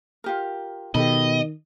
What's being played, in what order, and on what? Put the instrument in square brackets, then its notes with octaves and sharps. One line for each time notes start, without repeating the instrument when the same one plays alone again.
[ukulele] F4 G4 A#4
[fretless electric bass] B2 [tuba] D#3 [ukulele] G4 A4 B5 [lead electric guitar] D#5